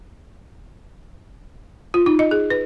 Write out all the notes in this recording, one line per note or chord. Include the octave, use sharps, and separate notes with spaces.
F4
D#4
D#5
G#4
B4